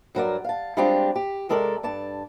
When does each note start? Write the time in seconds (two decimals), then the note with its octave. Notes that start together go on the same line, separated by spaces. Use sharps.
0.15 G2 F#3 A#4 D5
0.44 F5 A5
0.77 G3 G#3 C4 D4 F4 G4
1.16 G4
1.49 C3 G#3 A4 A#4 D5
1.83 G2 D5 A5